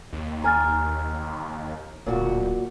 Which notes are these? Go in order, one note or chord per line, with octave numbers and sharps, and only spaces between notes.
D#2
G#5 A#5 F6 A6
D1 A#2 F#4 A#4